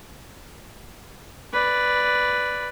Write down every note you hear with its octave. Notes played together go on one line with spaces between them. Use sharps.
B4 D5